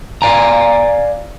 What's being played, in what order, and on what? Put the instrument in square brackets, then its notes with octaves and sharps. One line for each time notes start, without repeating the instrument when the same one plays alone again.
[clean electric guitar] D5 F5 G#5 A#5